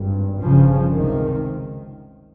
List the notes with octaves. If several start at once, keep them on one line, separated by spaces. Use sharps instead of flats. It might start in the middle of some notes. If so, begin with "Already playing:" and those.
Already playing: G#1 G2
G1 G2 C#3 F3
C#2 C3 D#3